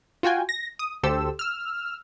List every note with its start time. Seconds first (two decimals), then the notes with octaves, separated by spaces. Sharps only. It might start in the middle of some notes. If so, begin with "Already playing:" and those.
0.23 F4 F#4 G5 G#5
0.49 A#6
0.79 D#6
1.03 D2 G4 A4 C5 E6
1.39 E6 F6